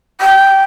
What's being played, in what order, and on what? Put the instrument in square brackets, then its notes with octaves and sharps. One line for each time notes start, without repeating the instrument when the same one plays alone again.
[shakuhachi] G5